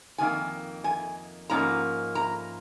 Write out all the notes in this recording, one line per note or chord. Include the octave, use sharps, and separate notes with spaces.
F2 D#3 A#3 G#5
G#5
G#2 F3 A#3 C#4 A#5
A#5